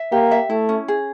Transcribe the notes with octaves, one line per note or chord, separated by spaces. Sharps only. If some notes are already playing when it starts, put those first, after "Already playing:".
Already playing: E5
A#3 G4
E5
A3 E4
C#4
G#4